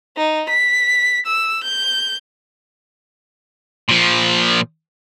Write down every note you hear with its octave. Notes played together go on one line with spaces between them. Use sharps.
D#4
B6
E6
G6
A#2 F3